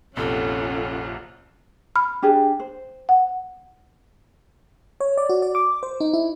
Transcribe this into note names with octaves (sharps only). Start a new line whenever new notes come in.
A#1 F2 C3 C#4 F4 A4 F#5
B5 F6
D4 G4 G#4
C5
F#5
C#5
D5
F#4
D5
D6
C5
D#4
E4